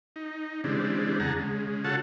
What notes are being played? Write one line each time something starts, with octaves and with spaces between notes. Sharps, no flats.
D#4
C#3 E3 G3 G#3 C4 D4
E2 G#4 F#5 A5 A#5
C#3 G#3
C#4 F4 F#4 A4 F#5 A5